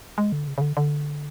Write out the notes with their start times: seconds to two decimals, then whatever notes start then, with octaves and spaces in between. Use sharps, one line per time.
0.18 G#3
0.32 D3
0.48 C#3
0.58 C#3
0.61 D3
0.77 D3